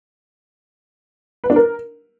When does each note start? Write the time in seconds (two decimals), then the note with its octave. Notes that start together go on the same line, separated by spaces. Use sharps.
1.44 B4
1.50 D4
1.56 A#4